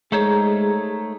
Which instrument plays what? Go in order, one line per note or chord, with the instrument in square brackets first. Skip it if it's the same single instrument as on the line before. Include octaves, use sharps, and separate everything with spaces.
[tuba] G#3 [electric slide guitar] A3 C5 C#5 [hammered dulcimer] D#4 A#4 [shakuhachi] G#4